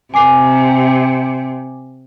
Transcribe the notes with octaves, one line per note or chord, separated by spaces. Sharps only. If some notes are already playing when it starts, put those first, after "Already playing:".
C3 G#5 D6 C7